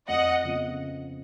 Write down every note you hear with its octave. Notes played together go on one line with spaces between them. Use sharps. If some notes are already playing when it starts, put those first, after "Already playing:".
F2 D#5 F#5
C#3 F3 B3